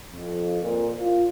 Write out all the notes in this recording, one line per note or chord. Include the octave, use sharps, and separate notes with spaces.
F2
A#2
F4